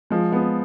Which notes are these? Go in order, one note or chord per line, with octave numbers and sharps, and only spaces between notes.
F3 G#3
G#3 B3